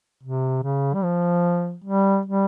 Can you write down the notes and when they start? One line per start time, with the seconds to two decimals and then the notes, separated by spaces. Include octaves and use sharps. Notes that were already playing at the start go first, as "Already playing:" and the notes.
0.23 C3
0.63 C#3
0.94 G3
1.04 F3
1.84 G3
2.26 G3